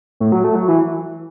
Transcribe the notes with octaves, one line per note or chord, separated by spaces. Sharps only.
A2
F#3
A3
F#3
E3